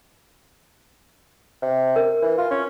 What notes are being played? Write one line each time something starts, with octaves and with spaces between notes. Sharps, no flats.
C3
A#4
E3
F4
C#4